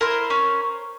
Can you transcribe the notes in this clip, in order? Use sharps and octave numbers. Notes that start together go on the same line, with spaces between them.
E4 A#4 C5
C#4